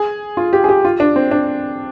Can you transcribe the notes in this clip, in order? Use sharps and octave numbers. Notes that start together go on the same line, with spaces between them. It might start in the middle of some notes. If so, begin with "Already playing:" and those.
Already playing: G#4
F4
G4
G#4
G4
F4
D4
C4
D4